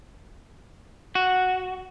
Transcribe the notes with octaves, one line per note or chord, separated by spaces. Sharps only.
F#4